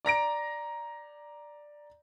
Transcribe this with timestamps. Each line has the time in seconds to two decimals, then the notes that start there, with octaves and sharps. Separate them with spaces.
0.05 D5 A#5 A#6 D7